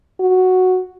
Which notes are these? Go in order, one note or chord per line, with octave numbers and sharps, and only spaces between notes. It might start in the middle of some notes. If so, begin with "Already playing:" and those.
F#4